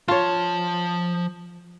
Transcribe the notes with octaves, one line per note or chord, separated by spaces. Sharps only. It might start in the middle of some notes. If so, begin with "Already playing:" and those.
F3 F4 C#5 A5